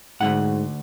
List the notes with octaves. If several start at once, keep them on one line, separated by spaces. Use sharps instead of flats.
D2 G#2 F3 F#5